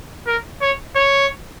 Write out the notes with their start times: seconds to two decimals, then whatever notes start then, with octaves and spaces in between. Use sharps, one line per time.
0.27 A#4
0.61 C#5
0.96 C#5